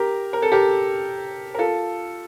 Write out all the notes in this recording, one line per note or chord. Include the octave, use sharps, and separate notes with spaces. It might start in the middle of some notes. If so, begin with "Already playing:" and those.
Already playing: G4 A#4
A#4
A4
G4 A#4
A#4
F4 A4